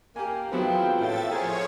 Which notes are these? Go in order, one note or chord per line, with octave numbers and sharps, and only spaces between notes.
A#3 G4 G#5
F3 F#3 G#3 B3 C4 E4 F4 G5
A2 E5 A6
F3 G#4 A#4 C5 C#5